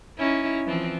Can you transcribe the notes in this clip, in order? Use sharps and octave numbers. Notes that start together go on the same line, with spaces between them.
C#4 D#4 E4
E3 F3 C4